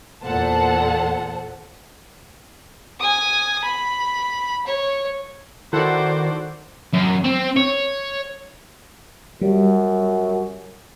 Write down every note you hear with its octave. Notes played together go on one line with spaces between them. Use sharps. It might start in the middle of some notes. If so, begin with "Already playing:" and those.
E2 A#2 A4 C5 F#5 A5
G#5 D#6
B5
C#5
D#3 E4 F#4 A4 C5 D5 F#5
F#2
C4
C#5
F#2 G3